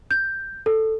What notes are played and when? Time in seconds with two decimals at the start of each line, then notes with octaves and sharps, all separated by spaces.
0.11 G6
0.66 A4